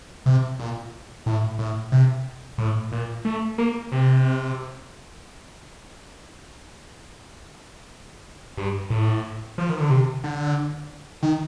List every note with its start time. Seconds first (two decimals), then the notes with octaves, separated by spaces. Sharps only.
0.26 C3
0.59 A#2
1.26 A2
1.59 A2
1.92 C3
2.58 A2
2.92 A#2
3.25 A3
3.58 A#3
3.92 C3
8.57 G2
8.90 A2
9.58 F3
9.69 D#3
9.80 D3
9.90 C3
10.24 D3
11.23 D#3